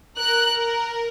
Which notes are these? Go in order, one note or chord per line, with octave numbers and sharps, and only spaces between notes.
A#4 F#6
A#4